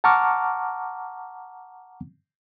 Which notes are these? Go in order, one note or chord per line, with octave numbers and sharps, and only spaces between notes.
F#5 A5 A#5 C#6 D6 F6